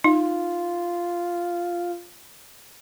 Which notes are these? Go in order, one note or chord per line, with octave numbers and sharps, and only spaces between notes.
D#4 F4